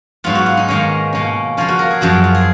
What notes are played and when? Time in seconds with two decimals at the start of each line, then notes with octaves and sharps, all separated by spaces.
0.24 G#2 F#3 B3 F4
0.35 F#4
0.46 F4
0.57 D#4
0.68 G#2 D#3 A#3 C#4
1.13 B2 A#3 C#4
1.57 C#3 F3 A#3 C#4 F4
1.68 F#4
1.79 A#4
1.91 G#4
2.01 F#2 F3 A#3 F#4
2.24 F4
2.34 G#4